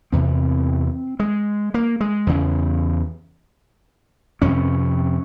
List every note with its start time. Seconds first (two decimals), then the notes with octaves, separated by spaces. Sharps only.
0.12 E2 C3 C4
1.20 G#3
1.74 A#3
2.00 G#3
2.27 E2 C#3
4.42 F2 C3 C#4